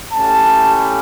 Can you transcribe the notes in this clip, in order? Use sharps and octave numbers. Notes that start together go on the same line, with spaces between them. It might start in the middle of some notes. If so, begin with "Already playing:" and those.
A3 C#4 E4 G4 A5